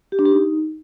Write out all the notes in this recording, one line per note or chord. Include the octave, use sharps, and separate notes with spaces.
G4
D4
G4
D#4